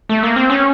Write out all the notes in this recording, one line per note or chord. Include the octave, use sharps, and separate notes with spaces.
A3
A#3
C4
C#4